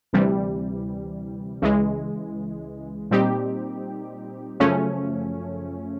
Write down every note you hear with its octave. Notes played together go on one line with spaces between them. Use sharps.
D2 C3 E3 G3
C#2 C#3 E3 G#3
A#2 G3 C4 D#4 G4
F#2 C#3 F3 A3 C#4